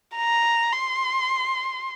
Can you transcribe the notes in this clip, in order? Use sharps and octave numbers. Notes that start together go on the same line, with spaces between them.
A#5
C6